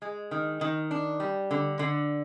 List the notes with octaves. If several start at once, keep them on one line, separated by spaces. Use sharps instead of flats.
G#3
D#3
D#3
D4
G3
D3
D3